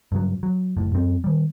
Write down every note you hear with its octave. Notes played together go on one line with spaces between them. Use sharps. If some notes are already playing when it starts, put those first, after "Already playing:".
G2 C#3 F#3
F#3
F#1 A2
F#2 C4
D#3 G3